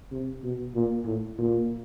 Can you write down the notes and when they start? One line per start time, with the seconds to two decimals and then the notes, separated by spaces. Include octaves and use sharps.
0.11 C3
0.43 B2
0.75 A#2
1.05 A2
1.38 A#2